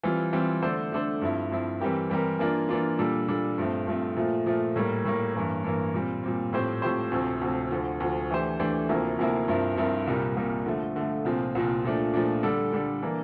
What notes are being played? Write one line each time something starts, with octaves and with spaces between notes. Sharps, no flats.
E3 G3 C4 F4
E3 G3 C4 F4
D3 A3 D4 A4 C5
D3 A3 D4 A4 C5
G2 F3 C4 E4
G2 F3 C4 E4
E3 G3 C4 G4 A#4
E3 G3 C4 G4 A#4
E3 A#3 D4 F4
E3 A#3 D4 F4
A#2 G3 D4 A4
A#2 G3 D4 A4
G2 F3 A3 C4
G2 F3 A3 C4
A#2 F3 A3
A#2 F3 A3
A2 G3 A#3
A2 G3 A#3
G2 E3 A#3
G2 E3 A#3
A#2 G3 C4
A#2 G3 C4
A2 F3 C4 G4 C5
A2 F3 C4 G4 C5
D2 C3 F3 C4
D2 C3 F3 C4
D2 D3 F3
D2 D3 F3
E3 A3 D4 G4 C5
E3 A3 D4 G4 C5
D2 C3 F3 A#3 E4
D2 C3 F3 A#3 E4
G2 F3 C4 E4 A#4
G2 F3 C4 E4 A#4
C2 A#2 G3 A#3
C2 A#2 G3 A#3
D3 F3 A3
D3 F3 A3
C2 A#2 F3 C4
C2 A#2 F3 C4
A#2 F3 A3 D4
A#2 F3 A3 D4
D3 G3 D4 A4
D3 G3 D4 A4
E3 A#3 D4